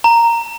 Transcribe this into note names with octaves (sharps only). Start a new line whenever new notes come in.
A#5